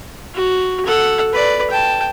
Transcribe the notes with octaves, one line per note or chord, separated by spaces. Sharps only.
F#4
A4 F#5
B4 D5
G5 A5